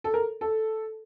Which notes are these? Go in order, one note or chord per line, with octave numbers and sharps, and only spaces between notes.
A4
A#4
A4